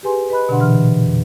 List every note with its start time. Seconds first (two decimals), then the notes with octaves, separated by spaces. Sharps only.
0.03 G4 G#4 B4 G#5 C6
0.30 B4 D#5 B5 F#6
0.49 B2 D3 D4 F#5 C6
0.60 A#2 E3 C6 F6
1.01 F2